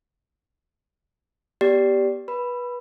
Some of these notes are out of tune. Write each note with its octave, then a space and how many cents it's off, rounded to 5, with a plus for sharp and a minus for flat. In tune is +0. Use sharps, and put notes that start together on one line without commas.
B3 -15 G4 -5 D5 -15
B4 -20 B5 +0